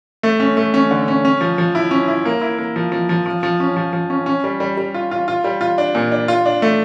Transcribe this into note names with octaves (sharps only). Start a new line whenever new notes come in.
A3
C#4
A3
C#4
D3
C#4
C#4
F3
F3
E4
C#4
E4
A#3
E4
A#3
F3
F3
F3
F3
F3
C#4
F3
F3
C#4
C#4
G3
G3
G3
F4
F4
F4
G3
F4
D4
A#2
D4
F4
D4
A3